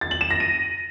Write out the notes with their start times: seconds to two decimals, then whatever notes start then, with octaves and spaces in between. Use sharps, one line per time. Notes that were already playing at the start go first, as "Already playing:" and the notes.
0.01 A6
0.11 F#7
0.21 E7
0.30 A#6
0.40 D#7